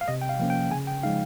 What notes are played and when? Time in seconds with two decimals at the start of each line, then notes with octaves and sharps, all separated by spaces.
0.01 F5
0.08 C3 D#5
0.22 G5
0.29 F5
0.39 F3 A#3 C#4
0.50 G5
0.71 C#3 G#5
0.87 G5
1.03 F3 G#3 D#4 F5